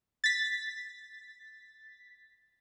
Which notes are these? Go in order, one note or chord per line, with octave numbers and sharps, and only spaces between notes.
A6 B6